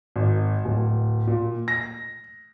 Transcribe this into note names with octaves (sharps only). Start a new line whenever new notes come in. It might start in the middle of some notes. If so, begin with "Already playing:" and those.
G#1
D1
A#2
A#6